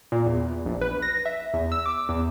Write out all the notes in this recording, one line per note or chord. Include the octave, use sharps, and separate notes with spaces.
A#2
E2
A#1
B4
A#6
E5
E2
E6
D6
E2